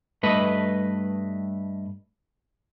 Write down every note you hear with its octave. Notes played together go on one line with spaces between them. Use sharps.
G2 A3 B4 D#5